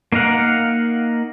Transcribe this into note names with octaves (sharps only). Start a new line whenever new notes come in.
A#3 D#4 A#4 F5 F#5